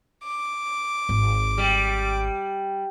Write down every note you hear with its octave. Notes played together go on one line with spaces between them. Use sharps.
D6
G#1
G3